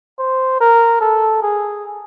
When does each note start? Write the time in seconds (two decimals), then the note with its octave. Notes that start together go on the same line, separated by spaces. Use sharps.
0.19 C5
0.60 A#4
1.01 A4
1.42 G#4